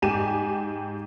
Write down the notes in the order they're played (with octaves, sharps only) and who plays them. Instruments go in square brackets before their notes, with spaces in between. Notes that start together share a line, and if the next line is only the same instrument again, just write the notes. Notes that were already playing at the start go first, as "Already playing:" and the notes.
[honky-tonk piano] G#2 G4 G#5 D6 D#7 E7